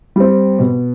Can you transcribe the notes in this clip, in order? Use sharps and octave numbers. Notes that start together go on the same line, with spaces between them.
G3 C4
B2